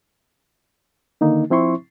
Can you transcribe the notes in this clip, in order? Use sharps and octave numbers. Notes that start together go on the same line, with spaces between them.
D3 D#3 A#3 D#4
F3 C4 E4 C6 C#6